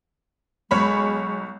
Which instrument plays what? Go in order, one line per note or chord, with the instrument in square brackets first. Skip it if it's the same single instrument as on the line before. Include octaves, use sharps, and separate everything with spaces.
[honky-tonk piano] B1 C#5 B5 [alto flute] G#3